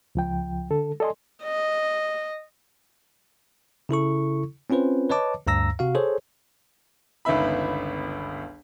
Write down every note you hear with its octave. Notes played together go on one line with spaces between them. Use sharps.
C#2 F3 G5
D3 A4
A4 D5 D#5 G#5 C6
D#5
C#3 E4 A4 C#6
C4 C#4 F4 B4 C5
B4 C#5 D#5 A5 D6
D2 G2 A#5 E6 A#6
C3 F#4 F5
G#4 A4 C5 C#5
G1 C#2 D#3 B3 E5 B5